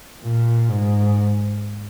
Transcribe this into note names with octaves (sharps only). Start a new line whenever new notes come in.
A#2
G#2